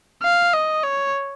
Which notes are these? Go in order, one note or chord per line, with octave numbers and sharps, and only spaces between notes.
F5
D#5
C#5